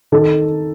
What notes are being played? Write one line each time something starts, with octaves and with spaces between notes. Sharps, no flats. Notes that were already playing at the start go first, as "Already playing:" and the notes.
D#3 A4